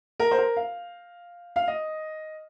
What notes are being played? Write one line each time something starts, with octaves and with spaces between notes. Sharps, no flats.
A#4
C5
A#4
F5
F5
D#5